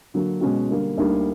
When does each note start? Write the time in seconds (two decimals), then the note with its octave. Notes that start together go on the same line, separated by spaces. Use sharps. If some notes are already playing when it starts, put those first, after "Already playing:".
0.14 D3 F#3 A#3
0.41 B2 G#3 C#4 F#4
0.69 D3 G3 A#3
0.98 D2 D3 G3 A#3 D#4